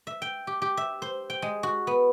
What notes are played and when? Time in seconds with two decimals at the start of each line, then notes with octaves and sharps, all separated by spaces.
0.07 E5
0.22 G5
0.47 G4
0.62 G4
0.77 E5
1.02 C5
1.30 G5
1.42 G#3
1.63 F#4
1.87 B3